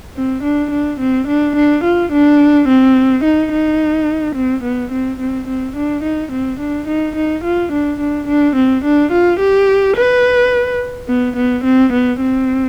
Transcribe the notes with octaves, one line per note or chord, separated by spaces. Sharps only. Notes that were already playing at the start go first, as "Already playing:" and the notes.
C4
D4
D4
C4
D4
D4
F4
D4
C4
D#4
D#4
C4
B3
C4
C4
C4
D4
D#4
C4
D4
D#4
D#4
F4
D4
D4
D4
C4
D4
F4
G4
B4
B3
B3
C4
B3
C4